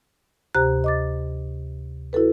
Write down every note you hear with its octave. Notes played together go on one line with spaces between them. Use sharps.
D2 C3 G4 C5 A#5 F#6
D#5 D6 A6
E4 F#4 A4 B4